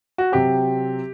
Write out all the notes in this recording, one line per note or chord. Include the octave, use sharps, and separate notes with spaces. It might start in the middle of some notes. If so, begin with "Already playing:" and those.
F#4
C3 F#3 C4 G4